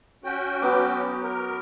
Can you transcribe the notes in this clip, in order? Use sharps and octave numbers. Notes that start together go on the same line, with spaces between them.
C#4 F#4 G5
F#3 B3 D6
A#4